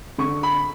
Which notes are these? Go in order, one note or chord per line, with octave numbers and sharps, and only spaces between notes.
D3 C#6
B5